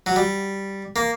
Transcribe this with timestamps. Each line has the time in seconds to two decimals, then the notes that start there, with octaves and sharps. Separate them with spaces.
0.06 F#3
0.16 G3
0.96 A#3